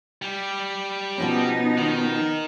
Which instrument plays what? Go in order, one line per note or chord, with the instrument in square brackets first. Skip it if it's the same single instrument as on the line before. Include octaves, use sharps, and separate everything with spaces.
[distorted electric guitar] G3
[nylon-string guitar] B2 F3 C#4 [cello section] B3 D#4
[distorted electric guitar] D#3